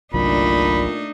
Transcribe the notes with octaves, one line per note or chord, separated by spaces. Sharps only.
G1 C2 A#2 F#3 A3 D4 D#4 B5